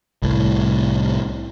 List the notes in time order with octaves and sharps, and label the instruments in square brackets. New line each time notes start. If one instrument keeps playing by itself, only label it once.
[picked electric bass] C2 A2